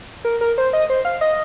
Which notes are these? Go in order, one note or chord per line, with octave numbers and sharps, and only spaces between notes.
A#4
A#4
C5
D#5
C5
F5
D#5